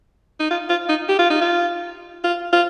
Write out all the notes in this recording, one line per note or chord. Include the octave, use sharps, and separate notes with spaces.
D#4
F4
F4
D#4
G4
F4
D#4
F4
F4
F4